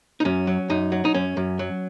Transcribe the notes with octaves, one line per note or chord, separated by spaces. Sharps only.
D#4
F#2 C#4
F#3
F#2 D#4
F#3
D#4
F#2 C#4
F#2
F#3